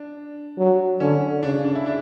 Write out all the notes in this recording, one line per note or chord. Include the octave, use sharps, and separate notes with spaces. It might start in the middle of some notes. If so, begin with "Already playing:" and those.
Already playing: D4
F#3
D3 C#4
C#3 D4
D4
E4
D4